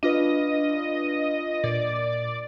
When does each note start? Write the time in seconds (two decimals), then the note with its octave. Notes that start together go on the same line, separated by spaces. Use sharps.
0.03 D4 F4 B4 D#5
1.64 A#2 D5